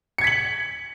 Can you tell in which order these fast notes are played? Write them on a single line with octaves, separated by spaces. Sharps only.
C#7 G#6 B6 F#7